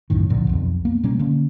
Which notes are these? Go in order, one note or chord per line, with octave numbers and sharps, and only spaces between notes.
B1 F#2 A2 D#3
D2 A#2 D3 F3
B1 F2
A#3 B3
B2 G3 A#3 C#4
D3 A#3 C#4